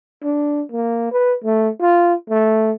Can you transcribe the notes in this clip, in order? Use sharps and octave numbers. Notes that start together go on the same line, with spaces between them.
D4
A#3
B4
A3
F4
A3